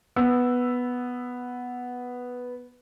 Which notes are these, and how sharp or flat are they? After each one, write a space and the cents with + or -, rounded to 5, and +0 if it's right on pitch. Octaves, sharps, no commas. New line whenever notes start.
B3 +0 E6 +0